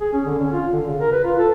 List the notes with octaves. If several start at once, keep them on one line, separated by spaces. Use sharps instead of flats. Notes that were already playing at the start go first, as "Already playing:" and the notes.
G#4
C#4
D3
C#4
F4
D3
C#3
A#4
B4
F4
A4